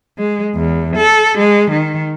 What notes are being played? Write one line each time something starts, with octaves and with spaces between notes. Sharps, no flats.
G#3
E2
A4
G#3
D#3